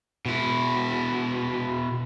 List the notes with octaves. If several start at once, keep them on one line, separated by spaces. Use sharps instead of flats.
B2 E4